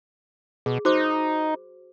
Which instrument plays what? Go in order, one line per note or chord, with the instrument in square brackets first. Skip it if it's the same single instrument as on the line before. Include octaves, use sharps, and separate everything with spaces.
[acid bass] B2 [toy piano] G#4
[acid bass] D#4 [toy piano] F#4 C5 D6